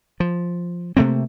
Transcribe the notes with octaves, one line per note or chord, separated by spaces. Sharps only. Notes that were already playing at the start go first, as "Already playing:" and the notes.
F3
C3 A3 A#3 C4